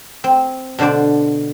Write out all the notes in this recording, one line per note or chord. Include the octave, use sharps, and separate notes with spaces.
C4
B2 D3 D4 C5 D5